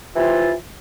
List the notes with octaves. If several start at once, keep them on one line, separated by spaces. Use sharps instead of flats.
C3 E3 F4